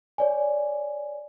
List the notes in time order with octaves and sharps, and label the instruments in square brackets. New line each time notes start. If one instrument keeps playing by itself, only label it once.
[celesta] C#5 D5 G#5